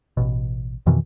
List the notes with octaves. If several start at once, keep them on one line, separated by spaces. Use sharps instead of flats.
A1 B2
F2 B2 D#3 E3